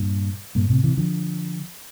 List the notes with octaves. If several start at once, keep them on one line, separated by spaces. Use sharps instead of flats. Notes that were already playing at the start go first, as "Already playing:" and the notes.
Already playing: G2 A#2
G2 A#2
A2 C3
C3 E3
D3 F3